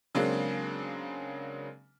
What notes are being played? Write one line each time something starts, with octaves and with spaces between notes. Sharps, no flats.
C#3 F#3 G#3 A#3 C4 D4